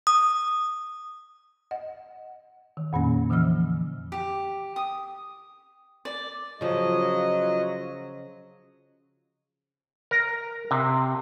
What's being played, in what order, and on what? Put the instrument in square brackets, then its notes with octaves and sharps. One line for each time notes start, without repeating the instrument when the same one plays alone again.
[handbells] D#6
[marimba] D#5 F#5
D#3
F2 A#2 D#3 A#3 C#4
D3 E3 F3 E6 F6
[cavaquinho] G4
D#6
D5
[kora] C#3 F3 [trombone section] F#3 F4 [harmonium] D#5
[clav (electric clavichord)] A#4
C3